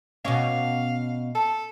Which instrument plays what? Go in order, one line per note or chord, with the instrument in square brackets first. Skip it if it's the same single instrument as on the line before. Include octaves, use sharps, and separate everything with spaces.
[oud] B2 C#4 [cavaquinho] D#5 C#6 D6 [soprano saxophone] F5
[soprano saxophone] A4 [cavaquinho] A5